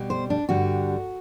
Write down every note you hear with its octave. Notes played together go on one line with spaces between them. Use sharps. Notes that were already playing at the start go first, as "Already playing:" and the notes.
Already playing: B2 G3
C5
D4
G2 D3 G3 F#4